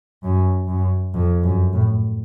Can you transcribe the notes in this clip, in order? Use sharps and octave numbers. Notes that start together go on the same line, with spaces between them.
F#2
F#2
F2
F#2
A2